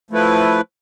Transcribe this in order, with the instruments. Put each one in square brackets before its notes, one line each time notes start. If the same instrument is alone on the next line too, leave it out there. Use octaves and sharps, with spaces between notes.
[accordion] F3 A3 E4 B4